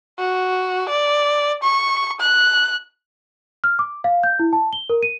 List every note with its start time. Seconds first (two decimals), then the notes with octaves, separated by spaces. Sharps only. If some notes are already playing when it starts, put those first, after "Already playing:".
0.19 F#4
0.89 D5
1.63 C#6
2.21 F#6
3.64 F6
3.79 D6
4.04 F5
4.24 G6
4.39 E4
4.53 A5
4.73 G7
4.90 A#4
5.03 D#7